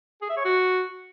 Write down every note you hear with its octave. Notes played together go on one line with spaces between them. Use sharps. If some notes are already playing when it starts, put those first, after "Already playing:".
G#4
E5
C#5
F#4